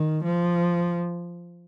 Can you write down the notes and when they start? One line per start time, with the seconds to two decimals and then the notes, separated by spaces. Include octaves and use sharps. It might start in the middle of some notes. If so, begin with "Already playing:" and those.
Already playing: D#3
0.24 F3